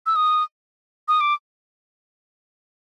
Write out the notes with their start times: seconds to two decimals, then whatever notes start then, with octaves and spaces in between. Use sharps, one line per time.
0.06 E6
0.16 D#6
1.08 D#6
1.21 D6